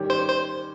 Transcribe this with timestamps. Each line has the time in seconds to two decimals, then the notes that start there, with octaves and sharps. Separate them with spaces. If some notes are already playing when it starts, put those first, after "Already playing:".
Already playing: D#3 G3 C#4 G4
0.10 C5
0.28 C5